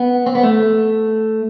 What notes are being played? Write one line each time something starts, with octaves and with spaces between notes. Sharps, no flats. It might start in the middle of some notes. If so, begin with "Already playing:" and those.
Already playing: B3
C4
B3
A3